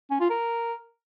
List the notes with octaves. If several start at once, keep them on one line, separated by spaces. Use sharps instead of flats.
C#4
F4
A#4